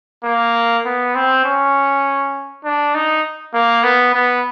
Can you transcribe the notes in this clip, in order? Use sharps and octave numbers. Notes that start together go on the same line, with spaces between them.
A#3
B3
C4
C#4
D4
D#4
A#3
B3
B3